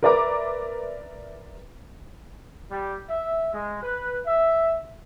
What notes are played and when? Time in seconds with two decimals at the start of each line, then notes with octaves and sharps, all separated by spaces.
0.03 A#4 B4 D5 E5 A#5 D6
2.71 G3
3.10 E5
3.53 G#3
3.83 B4
4.27 E5